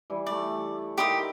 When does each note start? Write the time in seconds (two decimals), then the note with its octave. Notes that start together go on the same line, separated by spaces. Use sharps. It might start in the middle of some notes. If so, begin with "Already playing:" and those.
0.10 E3 G3 E4
0.26 A3 D5 E5
0.98 D#4 E4 G4 A#4 C6 D#6